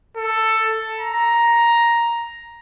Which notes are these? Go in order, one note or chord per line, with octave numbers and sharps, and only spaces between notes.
A4
A#5